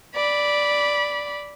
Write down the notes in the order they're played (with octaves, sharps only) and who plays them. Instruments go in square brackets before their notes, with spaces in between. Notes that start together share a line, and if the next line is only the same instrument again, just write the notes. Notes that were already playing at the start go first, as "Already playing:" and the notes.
[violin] D5 B5